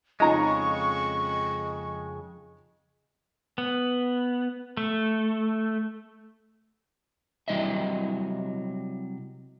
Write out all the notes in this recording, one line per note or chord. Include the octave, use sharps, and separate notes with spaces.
F2 C#3 G#3 D#4 A#5 C#6
B3
A3
C3 F#3 G3 E4 D#5 E5